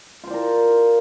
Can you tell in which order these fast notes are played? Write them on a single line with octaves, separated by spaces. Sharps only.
F4 C5 D5 A#4